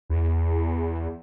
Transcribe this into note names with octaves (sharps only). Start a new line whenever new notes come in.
E2